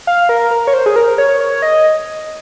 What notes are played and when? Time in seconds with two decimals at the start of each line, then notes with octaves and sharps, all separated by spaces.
0.07 F5
0.29 A#4
0.51 A#4
0.67 C#5
0.74 C5
0.86 G#4
0.96 A#4
1.18 C#5
1.40 C#5
1.62 D#5